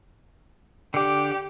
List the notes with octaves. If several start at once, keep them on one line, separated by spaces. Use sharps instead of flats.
D3 G4 D5